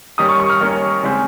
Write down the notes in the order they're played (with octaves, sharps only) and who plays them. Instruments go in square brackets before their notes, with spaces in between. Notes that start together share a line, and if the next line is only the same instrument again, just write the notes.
[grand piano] D#3 G3 A#3 C#4 D#6
C#6
C#6
F6
D#3 G3 A#3 C#4
C#3 G#3 C4